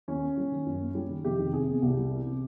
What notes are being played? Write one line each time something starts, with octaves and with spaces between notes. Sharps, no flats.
D#2 C#4
A#3
G3
D#3
F#2
A#3
G3
D#3
F1 G4
D#3
C3 G#4
E2
C2 G4
G3
E3
C3